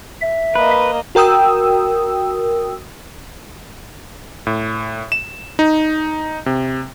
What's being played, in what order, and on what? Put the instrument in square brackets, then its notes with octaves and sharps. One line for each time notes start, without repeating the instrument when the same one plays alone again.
[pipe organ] E5
[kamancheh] A#3 D#5 [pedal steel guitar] B4
[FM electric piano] F#4 A#4 G5 D#6 E6
[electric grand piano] A2
E7
D#4
C3